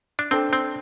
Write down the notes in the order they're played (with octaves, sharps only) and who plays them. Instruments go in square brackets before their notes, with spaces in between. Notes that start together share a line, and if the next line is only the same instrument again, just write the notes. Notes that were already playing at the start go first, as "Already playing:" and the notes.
[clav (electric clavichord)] D4
[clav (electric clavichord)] C4 [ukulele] D4 A4 C5 G5
[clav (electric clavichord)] C4